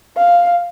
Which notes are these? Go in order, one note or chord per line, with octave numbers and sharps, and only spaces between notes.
F5